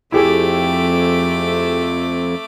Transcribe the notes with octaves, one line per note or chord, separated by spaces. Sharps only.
F2 A3 E4 G4 G#4 D6